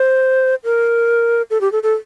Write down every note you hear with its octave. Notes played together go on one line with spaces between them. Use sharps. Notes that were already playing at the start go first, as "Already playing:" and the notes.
Already playing: C5
A#4
A4
G4
A4
A4